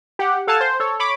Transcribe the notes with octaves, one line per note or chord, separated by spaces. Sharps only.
G4 F#5
A4 F5 F#5 G#5 A5
C5
A4 C#5
C#5 B5 D6